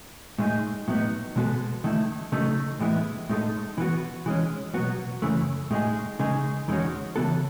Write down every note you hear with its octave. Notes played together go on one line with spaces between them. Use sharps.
A2 G#3 D#4 G#4
A2 F#3 B3 D#4
B2 G#3 B3 F#4 A4
D#3 A3 E4 A4
C#3 F#3 A3 D#4 A4
A2 E3 G#3 B3 E4
A2 G#3 D#4 A4
E3 B3 F#4
E3 G#3 C#4
B2 F#3 B3 F#4
F#2 C#3 E3 A3
A2 G#3 D#4 G#4
C#3 G#3 D#4 G#4
E2 D#3 G#3 C#4 F#4
C#3 E3 B3 F#4 A4